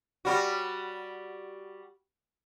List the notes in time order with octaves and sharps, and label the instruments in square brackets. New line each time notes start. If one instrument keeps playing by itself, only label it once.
[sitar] G3 F#4